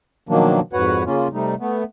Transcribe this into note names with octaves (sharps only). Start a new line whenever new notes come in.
B2 D#3 F3 F#3 A#3 D4
F2 G#2 F#4 B4 C#5 F#5
C#3 A#3 C#4 F4
C3 G3 A3 D#4
A3 B3